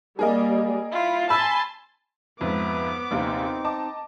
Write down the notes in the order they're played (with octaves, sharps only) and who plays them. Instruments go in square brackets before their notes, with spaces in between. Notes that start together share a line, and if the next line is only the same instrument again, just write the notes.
[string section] G3 A#3 [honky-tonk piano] G#4 A#4 D#5
[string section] E4 [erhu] F4
[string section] G#5 C6 [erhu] A5 [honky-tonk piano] B5 E6 B6
[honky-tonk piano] F2 G#2 [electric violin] B3 D6 [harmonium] B4 E5
[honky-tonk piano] A#1 D#2 C3 [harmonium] C4 D#4
[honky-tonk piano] D#5 A5 D6